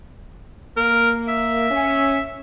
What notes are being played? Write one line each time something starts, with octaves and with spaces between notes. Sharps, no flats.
A#3 A#4
E5
C#4